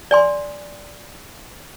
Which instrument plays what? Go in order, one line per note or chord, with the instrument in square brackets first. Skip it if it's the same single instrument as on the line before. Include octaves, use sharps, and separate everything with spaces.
[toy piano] D5 G#5 C6